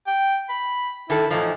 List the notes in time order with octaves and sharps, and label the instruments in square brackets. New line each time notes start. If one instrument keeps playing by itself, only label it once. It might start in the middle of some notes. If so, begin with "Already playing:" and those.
[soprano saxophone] G5
B5
[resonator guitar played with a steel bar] D#3 A4 [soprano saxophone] E4
[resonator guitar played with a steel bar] A2 E3 F3 [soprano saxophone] D#4